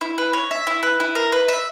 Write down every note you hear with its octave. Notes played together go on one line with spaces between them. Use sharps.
E4
B4
C#5
E5
E4
B4
E4
A#4
B4
E5